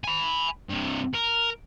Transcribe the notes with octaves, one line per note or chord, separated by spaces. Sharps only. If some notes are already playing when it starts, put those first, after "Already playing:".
G#5 B5
G2 C3
A#4